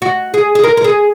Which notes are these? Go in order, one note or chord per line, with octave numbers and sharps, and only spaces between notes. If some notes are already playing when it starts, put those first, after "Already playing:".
F#4
G#4
G#4
A#4
A#4
G#4